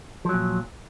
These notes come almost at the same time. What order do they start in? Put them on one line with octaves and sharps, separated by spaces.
F3 F#3 A#2